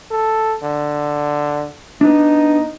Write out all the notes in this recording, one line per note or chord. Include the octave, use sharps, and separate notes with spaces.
A4
D3
B3 D4 D#4